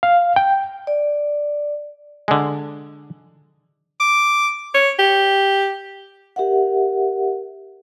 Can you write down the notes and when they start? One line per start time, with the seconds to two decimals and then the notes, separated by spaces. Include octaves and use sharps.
0.03 F5
0.36 G5
0.87 D5
2.28 D3 G#3
4.00 D6
4.74 C#5
4.99 G4
6.36 G4 A#4 E5 F#5